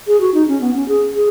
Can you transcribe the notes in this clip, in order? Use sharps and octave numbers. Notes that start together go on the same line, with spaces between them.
G#4
F#4
D#4
C#4
B3
C#4
G#4
G#4